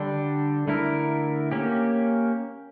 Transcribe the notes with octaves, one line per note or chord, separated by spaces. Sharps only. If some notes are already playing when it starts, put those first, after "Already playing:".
Already playing: D3 G3 D4
D3 A3 E4 A#4
A#3 C#4 G4